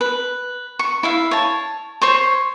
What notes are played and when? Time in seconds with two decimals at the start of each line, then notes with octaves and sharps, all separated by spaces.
0.01 B4
0.79 C#6
1.03 E4 E5 F5
1.31 C#5 A5
2.02 C5 C#5 C6 C#6